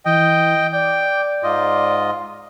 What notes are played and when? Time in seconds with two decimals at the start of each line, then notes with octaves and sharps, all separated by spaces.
0.05 E3 D#5 G5
0.73 D5 G5
1.43 G#2 F4 D#5